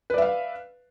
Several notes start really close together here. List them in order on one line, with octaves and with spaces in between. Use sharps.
B4 D5 E5 F5